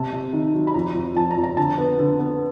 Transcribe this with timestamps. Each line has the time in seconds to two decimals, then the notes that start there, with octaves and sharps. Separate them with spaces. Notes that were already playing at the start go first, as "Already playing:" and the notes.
Already playing: C3 A5
0.13 C3
0.33 D#3
0.54 F#3
0.67 B5
0.74 F2 A#5
0.95 F2
1.16 F2 A5
1.31 A#5
1.37 F2
1.44 A#5
1.57 D3 A5
1.78 B3
1.99 D3
2.19 B3